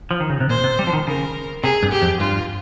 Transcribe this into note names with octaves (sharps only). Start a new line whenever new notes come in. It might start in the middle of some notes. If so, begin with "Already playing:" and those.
F3
D#3
C#3
C3
A#2 C5
C3
G3
F3
D#3
C#3 A#4
C3 G#4
G2
G4
F2
G2 F4